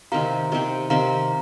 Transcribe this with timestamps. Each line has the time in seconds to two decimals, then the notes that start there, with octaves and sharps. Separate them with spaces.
0.12 C3 D#3 C4 G4 F5 A#5
0.52 C3 D#3 C4 G4
0.90 C3 D#3 C4 G4 F5 A#5